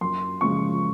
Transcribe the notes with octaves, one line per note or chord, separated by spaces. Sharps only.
F#2 C6
C#3 F3 G#3 C#6